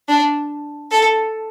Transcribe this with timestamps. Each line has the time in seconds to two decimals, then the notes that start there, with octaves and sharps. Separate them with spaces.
0.09 D4
0.91 A4